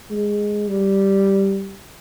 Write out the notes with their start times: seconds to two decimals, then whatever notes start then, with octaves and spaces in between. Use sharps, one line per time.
0.11 G#3
0.68 G3